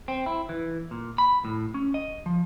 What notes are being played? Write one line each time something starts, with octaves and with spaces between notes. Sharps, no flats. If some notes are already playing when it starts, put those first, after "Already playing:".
C4
E4
E3
A#2
B5
A2
C#4
D#5
F3